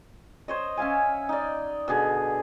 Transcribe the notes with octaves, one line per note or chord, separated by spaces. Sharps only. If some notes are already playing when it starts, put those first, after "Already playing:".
C5 C#5 D#5
C#4 E5 F5 G#5
D#4 D5
B2 D3 G#4